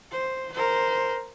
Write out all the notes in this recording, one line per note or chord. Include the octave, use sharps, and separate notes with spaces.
C5
A#4 C5